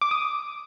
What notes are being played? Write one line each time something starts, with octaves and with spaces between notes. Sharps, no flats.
D6
D#6